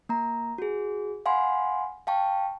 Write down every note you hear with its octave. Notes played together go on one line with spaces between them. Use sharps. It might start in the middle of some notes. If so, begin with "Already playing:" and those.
A#3 A#5
F#4 G#4
F5 F#5 G#5 B5 C6
F5 G5 A5 C#6